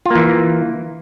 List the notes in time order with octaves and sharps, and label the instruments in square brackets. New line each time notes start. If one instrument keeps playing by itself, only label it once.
[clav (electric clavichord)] F4
A#3
E3